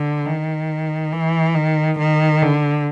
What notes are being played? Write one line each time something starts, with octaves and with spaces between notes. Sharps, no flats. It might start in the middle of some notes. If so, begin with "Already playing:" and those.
Already playing: D3
D#3
E3
D#3
D#3
D3